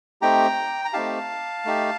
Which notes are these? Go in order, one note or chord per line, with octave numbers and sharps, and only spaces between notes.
A3 C4 D#4 G4 G5 A#5
A#5
A3 C4 D#4 G4 F5 A5
A3 D#4 G4